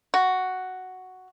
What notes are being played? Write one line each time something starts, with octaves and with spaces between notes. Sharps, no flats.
F#4